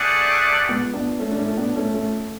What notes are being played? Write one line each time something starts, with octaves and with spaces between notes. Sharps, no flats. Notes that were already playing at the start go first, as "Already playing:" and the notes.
Already playing: A3 D4 G#4 D5 F#5
G#3 B3
B3 D4
A3 C#4
D4
A3 C#4
B3 D4
A3 C#4
A3 C#4